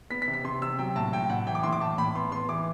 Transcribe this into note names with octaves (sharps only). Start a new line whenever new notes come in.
B3 B6
B6
C3
B6
C3 C6
C3 E6
F#3 G5
A2 A5
A2 G5
A2 F#5
E3 G5
D6
A2 C6
D6
A2 A5
A2 B5
B3 C6
B3 C6
E3 D6